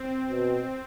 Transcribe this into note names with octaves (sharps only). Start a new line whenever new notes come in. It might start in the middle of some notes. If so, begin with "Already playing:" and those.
Already playing: C4
B2